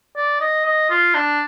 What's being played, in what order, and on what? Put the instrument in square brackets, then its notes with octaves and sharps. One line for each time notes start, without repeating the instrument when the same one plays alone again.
[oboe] D5
D#5
D#5
F4
D4